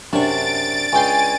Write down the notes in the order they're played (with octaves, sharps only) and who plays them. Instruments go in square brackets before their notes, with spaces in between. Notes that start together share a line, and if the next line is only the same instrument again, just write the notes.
[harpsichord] F#2 C3 C#6 [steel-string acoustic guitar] D4 [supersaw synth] A6 D7
[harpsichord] C#2 G5 C6 [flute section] G#5